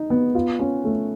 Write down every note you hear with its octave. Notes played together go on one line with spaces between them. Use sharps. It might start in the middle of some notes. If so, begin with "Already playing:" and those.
Already playing: D#4
B3
F4
C#4
A3